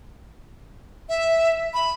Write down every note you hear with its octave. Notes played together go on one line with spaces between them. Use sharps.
E5
B5